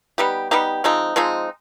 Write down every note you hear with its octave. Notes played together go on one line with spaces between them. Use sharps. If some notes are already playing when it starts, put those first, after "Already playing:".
G3 B3 D#4 G4
G3 B3 D#4 G4
F3 G#3 C4 D#4
F3 G#3 C4 D#4